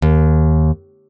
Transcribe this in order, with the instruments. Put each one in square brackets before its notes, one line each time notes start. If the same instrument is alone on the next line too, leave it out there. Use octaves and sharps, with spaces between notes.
[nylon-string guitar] D#2